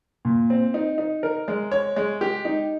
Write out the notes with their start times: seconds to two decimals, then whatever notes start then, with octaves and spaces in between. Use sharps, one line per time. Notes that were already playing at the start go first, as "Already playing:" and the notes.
0.25 A#2
0.50 C4
0.74 D#4
0.98 D#4
1.23 A#4
1.48 G#3
1.72 C#5
1.96 G#3
2.21 G4
2.45 D#4